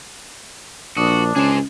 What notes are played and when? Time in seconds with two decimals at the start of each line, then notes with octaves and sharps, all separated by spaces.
0.97 A#1 D4 F#4 D#6
1.36 C#2 C#4 G#4 C5